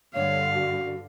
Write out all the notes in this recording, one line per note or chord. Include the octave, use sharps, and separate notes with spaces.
G2 D3 C#5 F5
F#4